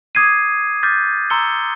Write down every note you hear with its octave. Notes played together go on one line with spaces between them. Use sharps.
D6 D#6 G#6 C7 D#7
D6 F6 G6 A6 B6
A#5 C6 E6 C#7 G7